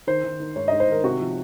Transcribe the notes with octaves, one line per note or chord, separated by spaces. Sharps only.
D#3 C5
D#3
D#3
G#2 C#5
G#2 D#5
C5
D#3 A#4
C3 F#4
F3